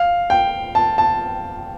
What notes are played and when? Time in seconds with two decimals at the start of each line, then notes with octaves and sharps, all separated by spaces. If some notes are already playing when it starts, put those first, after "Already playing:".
Already playing: F5
0.30 G5
0.75 A5
0.98 A5